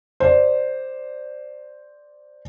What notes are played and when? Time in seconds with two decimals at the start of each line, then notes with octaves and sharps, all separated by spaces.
0.20 C5 D5